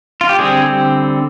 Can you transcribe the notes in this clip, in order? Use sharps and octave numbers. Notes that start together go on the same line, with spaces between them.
F4
G4
D3 G3 C4 G#4